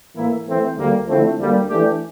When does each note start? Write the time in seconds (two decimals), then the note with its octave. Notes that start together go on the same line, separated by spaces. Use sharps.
0.15 A2 E3 A#3 E4
0.46 E3 A3 C4
0.76 D2 D3 G3 A#3
1.07 D3 F3 A3 C4 E4
1.38 D2 D3 G3 A#3
1.68 E3 A3 D4 G4